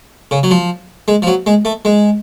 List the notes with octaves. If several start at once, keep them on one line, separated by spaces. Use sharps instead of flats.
C#3
F#3
F3
G#3
F3
F#3
G#3
A3
G#3